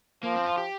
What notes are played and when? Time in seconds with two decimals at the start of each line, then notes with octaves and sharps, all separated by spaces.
0.24 F3 A#3
0.36 C4
0.46 F4
0.58 G4